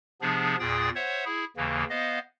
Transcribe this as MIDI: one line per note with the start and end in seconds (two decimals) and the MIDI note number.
0.21 0.56 48
0.21 0.56 53
0.21 0.56 59
0.21 0.56 62
0.21 0.56 68
0.60 0.90 40
0.60 0.90 46
0.60 0.90 68
0.60 0.90 79
0.60 0.90 87
0.60 0.90 93
0.95 1.24 72
0.95 1.24 73
0.95 1.24 76
0.95 1.24 78
1.25 1.45 64
1.25 1.45 68
1.57 1.84 39
1.57 1.84 49
1.57 1.84 52
1.57 1.84 58
1.90 2.19 59
1.90 2.19 72
1.90 2.19 75
1.90 2.19 77